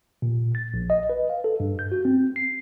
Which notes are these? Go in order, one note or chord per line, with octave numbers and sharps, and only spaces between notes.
A#2
A6
A#1
D#5
B4
F5
A4
G2
G6
F#4
C4
C7